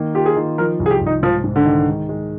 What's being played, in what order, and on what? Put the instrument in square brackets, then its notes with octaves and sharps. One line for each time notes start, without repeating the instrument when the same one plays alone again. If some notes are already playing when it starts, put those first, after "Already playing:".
Already playing: [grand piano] D#3 A#3
[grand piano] F4 [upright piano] G4
[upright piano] G#4
[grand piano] D#3
[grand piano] F3 [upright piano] A#4
[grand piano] C2
[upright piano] G#4
G4
[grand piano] C2
[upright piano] D#4
[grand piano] G#2 [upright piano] F3
[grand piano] G#2
[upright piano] D3
[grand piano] D#3
G#3
G#3